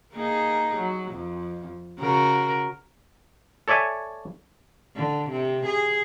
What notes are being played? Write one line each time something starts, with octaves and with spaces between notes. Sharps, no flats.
A#3 D#4 G#4
F#3
F2
C#3 F#4 A#4
A4 C#5 D5 E5 G#5
D3
C3
G#4